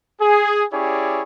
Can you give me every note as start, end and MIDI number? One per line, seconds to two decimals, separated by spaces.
0.21 0.64 68
0.73 1.22 61
0.73 1.22 64
0.73 1.22 67
0.73 1.22 68
0.73 1.22 73
0.73 1.22 74